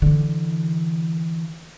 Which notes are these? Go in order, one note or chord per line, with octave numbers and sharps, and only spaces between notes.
D3 E3